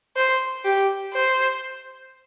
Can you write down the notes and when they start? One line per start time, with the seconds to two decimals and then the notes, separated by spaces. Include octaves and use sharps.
0.17 C5
0.65 G4
1.14 C5